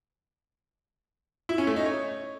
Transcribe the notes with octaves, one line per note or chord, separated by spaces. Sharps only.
E4
C#4
A3
D#4
C#5